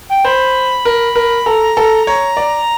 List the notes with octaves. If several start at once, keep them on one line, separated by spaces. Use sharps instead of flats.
G5
C5 B5
A#4
A#4
A4 A#5
A4
C#5 A#5
D5